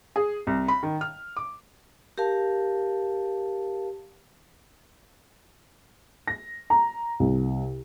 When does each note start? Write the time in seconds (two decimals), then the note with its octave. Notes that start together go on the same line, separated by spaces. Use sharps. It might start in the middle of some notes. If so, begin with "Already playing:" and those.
0.16 G#4
0.47 C2
0.68 B5
0.83 D#3
1.01 F6
1.37 D6
2.18 G4 A#4 F5 A5
6.27 A#6
6.70 A#5
7.20 C2